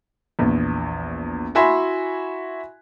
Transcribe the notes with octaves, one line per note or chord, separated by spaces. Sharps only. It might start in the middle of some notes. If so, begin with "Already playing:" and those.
A#1 E2
E4 F#4 E5 G#5 B5 C6